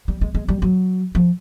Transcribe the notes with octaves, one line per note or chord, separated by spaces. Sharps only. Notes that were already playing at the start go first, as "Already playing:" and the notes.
G3
G#3
G#3
G3
F#3
F3